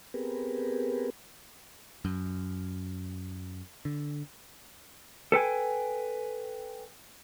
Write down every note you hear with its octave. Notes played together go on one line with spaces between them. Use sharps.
B3 C4 G4 G#4 A#4 B4
F#2
D3
A4 B4 G5 G#5